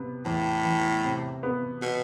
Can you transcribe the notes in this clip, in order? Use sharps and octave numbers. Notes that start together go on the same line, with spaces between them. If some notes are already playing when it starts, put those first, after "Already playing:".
Already playing: C3 B3
E2 A2
E3
C3
B3
B2